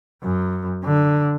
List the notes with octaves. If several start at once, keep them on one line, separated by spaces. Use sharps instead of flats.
F#2
D3